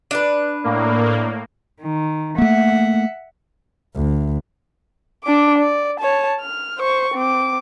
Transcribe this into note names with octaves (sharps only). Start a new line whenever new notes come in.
D4 B4
A2 A#3
D#3
A3 A#3 E5 F#5
D2
D4 D6
D5
C#5 A5
F6
C5 C#6
C4 D6